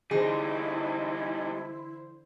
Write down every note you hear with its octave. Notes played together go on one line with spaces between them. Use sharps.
D3 E3 G3 D#4 E4 G#4 C5